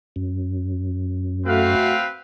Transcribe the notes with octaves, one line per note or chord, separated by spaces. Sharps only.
F#2
A3 C4 F#4 B4 F5